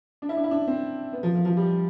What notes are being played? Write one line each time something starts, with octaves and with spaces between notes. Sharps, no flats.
D4
E4
D4
E4
D4
C4
B3
F3
F3
F3
G3